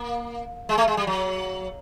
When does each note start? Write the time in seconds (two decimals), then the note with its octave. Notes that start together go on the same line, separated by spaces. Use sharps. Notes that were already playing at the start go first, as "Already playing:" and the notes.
Already playing: A#3
0.69 G#3
0.78 A3
0.88 G#3
0.97 G3
1.07 F#3